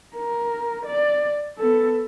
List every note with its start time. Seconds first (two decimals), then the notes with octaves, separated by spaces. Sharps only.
0.16 A#4
0.86 D5
1.58 B3 A4